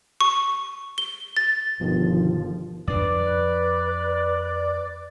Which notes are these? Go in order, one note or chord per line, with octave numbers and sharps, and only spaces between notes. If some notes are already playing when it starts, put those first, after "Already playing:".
C#6
G7
A6
G1 G2 B2 D#3 F3
F2 D4 B4 D5